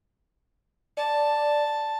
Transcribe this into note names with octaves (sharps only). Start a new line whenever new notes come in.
D5 A5